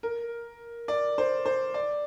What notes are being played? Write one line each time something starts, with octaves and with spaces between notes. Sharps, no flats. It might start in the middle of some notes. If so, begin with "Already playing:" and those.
A#4
D5
C5
C5
D5